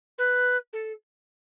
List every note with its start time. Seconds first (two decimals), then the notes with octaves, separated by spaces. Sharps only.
0.18 B4
0.73 A4